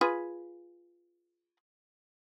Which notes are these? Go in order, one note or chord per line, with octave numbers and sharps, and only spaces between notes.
F4 G#4 B4